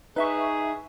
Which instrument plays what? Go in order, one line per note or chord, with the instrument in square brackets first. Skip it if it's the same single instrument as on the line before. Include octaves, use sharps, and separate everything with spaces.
[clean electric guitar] D#4 [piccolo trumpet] G#4 [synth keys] B4 E5 C#6